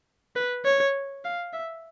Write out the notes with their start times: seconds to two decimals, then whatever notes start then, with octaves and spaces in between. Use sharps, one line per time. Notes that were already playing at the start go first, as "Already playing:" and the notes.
0.36 B4
0.65 C#5
1.25 F5
1.53 E5